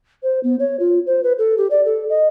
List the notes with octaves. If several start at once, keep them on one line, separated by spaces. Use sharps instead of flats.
C5
B3
C#5
F4
C5
B4
A4
G4
D5
A4
D#5